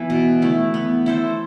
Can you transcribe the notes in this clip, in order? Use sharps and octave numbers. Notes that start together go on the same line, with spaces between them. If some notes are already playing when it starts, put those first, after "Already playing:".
Already playing: E3 B3 E4
B2
A3 E4
B3
E4 A4 C5